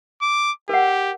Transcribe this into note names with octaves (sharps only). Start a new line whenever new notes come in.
D6
G4 A#4 F#5